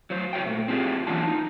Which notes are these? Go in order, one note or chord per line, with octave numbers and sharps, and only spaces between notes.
F#3 C5
F#4 C#5 E5 G5
A#2 A3
C4 F4 G4 G#4 D5
E3 F#3 A#3 D4 F4 A5
D#4